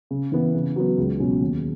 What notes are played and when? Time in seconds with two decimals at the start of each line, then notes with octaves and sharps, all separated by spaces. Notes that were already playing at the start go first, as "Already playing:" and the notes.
0.11 C#3
0.32 E3 B3
0.54 C#3
0.76 F#3 B3
0.97 C#2
1.19 B2 F#3 C#4
1.41 D#2